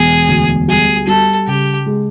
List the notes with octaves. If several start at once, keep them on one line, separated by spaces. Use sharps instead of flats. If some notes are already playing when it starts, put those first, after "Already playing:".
Already playing: E1 G#4
D2
G3 G#4
G3 A4
C#3 G4
G#3